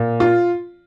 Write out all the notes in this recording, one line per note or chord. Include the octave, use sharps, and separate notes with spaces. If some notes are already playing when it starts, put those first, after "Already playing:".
Already playing: A#2
F4